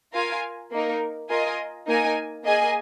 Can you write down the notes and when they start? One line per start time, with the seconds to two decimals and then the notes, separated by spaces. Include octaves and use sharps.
0.13 F4 A#4 F5 G#5
0.71 A#3 D#4 A#4
1.28 F4 A#4 D#5 G#5
1.87 A#3 D#4 A#4 G#5
2.44 A#3 G#4 D#5 G#5